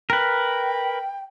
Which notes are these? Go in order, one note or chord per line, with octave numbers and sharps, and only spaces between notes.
A#4 B4 G5